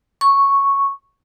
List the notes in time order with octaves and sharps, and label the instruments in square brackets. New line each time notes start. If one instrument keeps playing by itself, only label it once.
[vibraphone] C#6